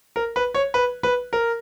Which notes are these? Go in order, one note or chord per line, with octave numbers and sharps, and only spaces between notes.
A#4
B4
C#5
B4
B4
A#4